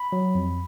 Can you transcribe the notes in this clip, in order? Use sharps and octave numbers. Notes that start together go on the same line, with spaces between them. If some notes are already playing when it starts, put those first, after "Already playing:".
Already playing: B5
F#3
F2